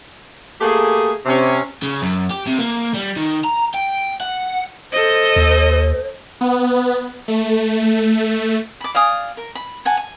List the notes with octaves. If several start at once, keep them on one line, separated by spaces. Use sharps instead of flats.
A3 A#3 G4 G#4
C3 C#4
C#3
F#2
G4
C3
A#3
G3
D#3
A#5
G5
F#5
A4 C5 D#5
D#2
B3
A3
B5 D6
D5 F5 G#5 D#6
A#4
B5
F#5 G#5 A5
G#5